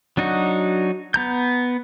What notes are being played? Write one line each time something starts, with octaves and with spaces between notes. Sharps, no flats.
F#3 D4 D#4 F#4
B3 A#5 G6